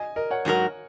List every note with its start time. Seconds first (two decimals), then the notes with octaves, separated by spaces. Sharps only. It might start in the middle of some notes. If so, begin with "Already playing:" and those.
Already playing: D#5 G#5
0.16 A#4 D#5
0.31 C#5 F#5
0.45 G#2 F#3 D#4 F#4 A#4